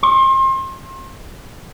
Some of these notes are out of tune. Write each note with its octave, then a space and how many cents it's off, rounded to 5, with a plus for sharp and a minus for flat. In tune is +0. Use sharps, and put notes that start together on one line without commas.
C6 +35